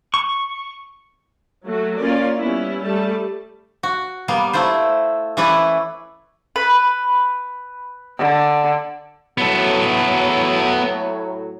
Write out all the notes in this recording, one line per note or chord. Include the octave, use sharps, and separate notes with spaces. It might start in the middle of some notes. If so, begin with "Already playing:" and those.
C#6
F#3 A3 F#4
A#3 C#4 F4 A#4 D5
G3 B3 C#4 E4
G3 A3 A4 A5
F#4
G3 A#3 B3 F5
A3 E4 F4 C5
E3 C#4 E4 B4 D5
B4
D3
A2 F#3 B3 A4